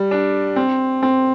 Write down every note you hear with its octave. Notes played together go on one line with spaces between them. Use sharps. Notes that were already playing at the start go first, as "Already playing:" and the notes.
Already playing: G3
D4
C4
C4